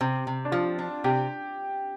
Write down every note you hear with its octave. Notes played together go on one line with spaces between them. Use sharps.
C3 C4
C3
D4
F3 F4
D4
C3 G4